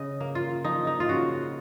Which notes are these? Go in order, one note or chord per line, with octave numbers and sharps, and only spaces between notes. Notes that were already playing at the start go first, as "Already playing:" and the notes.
Already playing: C#3 D#5
A#3
F4
F3 D#4
D#4
F4
C#3 F#4